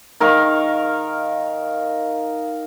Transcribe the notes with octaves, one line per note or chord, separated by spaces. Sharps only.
D#3 A#4 F5 C#6